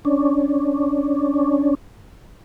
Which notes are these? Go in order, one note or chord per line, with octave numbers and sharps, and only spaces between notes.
C#4 D4